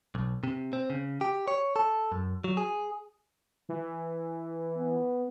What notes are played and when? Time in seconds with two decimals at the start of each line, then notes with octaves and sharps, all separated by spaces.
0.15 B1
0.44 C3
0.73 C4
0.90 C#3
1.21 G4
1.48 C#5
1.76 A4
2.12 F#2
2.44 F#3
2.57 G#4
3.69 E3
4.78 B3